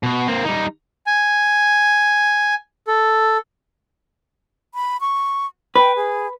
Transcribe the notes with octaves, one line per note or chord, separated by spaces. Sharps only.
B2 F#4
A#3 C4
G3 D#4
G#5
A4
B5
C#6
B4 G5
G#4